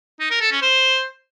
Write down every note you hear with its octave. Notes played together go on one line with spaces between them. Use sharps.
D#4
A#4
A4
C#4
C5